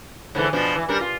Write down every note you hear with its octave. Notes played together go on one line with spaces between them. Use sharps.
G#2 D3 E3
B2 F3 D4
E3
G3 D4 A#4
F4